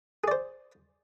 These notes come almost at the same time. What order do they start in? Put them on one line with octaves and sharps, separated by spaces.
G#4 D5 C5